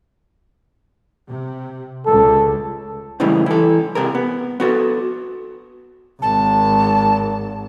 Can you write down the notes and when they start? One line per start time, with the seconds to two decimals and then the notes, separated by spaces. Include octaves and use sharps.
1.28 C3
2.07 C#2 A4
3.20 A2 C#3 E3 G3 G#3 D#4
3.46 E3 A4
3.95 C3 G#4 A#4
4.15 B3
4.60 B3 F#4 A4
6.21 G#1 A5